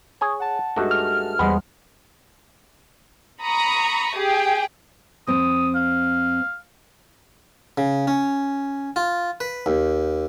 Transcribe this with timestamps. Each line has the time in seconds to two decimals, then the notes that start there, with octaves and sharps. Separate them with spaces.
0.21 G#4 C#5 G#5
0.40 F#5 A5
0.76 G2 G#3 A3 D#4 F#4
0.91 F6
1.39 E2 G3 G#3 B3 C5 F#5 B5
3.44 A#5 B5 C#6 D#6
4.17 G4 G#4 G5
5.27 F2 C4 D#6
5.75 F5
7.78 C#3
8.07 C#4
8.96 F4
9.40 B4
9.66 D#2